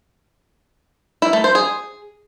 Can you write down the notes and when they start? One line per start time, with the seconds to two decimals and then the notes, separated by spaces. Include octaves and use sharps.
1.22 E4
1.33 A3
1.44 C5
1.55 G#4